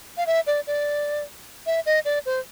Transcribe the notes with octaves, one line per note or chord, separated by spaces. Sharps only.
F5
E5
D5
D5
E5
D#5
D5
C5